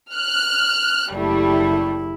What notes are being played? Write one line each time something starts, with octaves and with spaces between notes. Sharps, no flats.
F6 F#6
F#1 G3 A3 E4